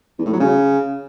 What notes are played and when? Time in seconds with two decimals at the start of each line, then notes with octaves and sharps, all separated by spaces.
0.19 E2
0.26 A2
0.33 F#3
0.40 C#3